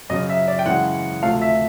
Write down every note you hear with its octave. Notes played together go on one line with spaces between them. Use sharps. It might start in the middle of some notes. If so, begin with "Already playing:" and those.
F#2 C#3 F#3 D#5
E5
D5
G5
F#2 C#3 E3 G#3 F#5
D2 C3 F3 A3 F5
E5